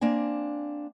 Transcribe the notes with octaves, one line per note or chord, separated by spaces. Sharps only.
A#3 C4 D4 G#5